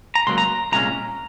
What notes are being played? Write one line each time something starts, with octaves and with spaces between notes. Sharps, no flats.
A#5
C#2 C3 F#3 A#3 C6
A#5
C2 A#2 G#3 C#4 A#5